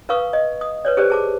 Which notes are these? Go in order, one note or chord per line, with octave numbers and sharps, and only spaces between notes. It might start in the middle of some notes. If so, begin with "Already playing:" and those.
A#4 B4 F5 C#6 D#6
D#5
D#6
B4 C#5 D5
G4 A4 B4 C5 D5
G#4 A5 D6